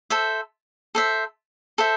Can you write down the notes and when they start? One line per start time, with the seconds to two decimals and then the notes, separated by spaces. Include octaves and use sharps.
0.10 A4 C5 E5
0.95 A4 C5 E5
1.78 A4 C5 E5